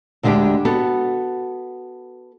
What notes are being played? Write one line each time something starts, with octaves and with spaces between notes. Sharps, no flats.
D2 D3 G#3 D4 G4
B3 F#4 A4